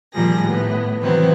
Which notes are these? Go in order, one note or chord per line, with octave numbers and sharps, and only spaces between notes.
A#2 D#3 F3 G3 G#4 A#6
A2 B3
C3 D#3 E3 F#3 B3 C4